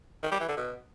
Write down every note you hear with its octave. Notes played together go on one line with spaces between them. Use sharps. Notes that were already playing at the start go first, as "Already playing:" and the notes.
D#3
G3
E3
D3
B2